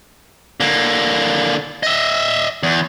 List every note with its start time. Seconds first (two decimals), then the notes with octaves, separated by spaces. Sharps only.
0.60 D3 A#3
1.83 D#5 E5
2.63 E2